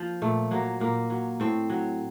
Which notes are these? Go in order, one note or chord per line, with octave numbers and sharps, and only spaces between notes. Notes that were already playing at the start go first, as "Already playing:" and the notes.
Already playing: F3 A#3
A#2 A3
F#3 A#3
A#2 A#3
F#3
A2 C4
F#3